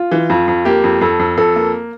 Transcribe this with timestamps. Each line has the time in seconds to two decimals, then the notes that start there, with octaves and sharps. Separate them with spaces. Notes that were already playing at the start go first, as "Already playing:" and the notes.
Already playing: F4
0.11 E3
0.30 F2 F4
0.48 F2
0.65 A#3 G4
0.84 F2
1.01 F2 A4
1.19 F2
1.37 F2 A4
1.56 A#3